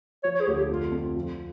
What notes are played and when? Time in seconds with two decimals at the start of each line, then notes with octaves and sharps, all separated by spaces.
0.23 F3 C#5
0.35 C#5
0.41 G#4
0.47 D2 G4
0.58 G4
0.69 F2 F4
0.92 F2
1.16 F3